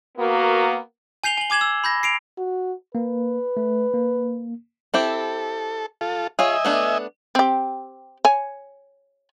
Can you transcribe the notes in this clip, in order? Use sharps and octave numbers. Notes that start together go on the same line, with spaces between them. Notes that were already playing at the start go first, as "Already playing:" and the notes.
A#3 B3 F#4 A#4
G#5 G6 C7 F7 G7
G#5 F#7
G#5 D6 G#6 E7 F#7
E6
B5 G6 A#6
C7 D7 F7
F#4
A#3 B4
A3
A#3
C4 E4 G4 A4
F4 A4
F4 G#4 C#5 D#5 E5 G#5
A3 B3 D4
C4 G4
C#5 G#5